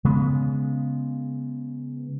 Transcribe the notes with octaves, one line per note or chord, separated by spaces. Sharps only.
C#3 G#3 B3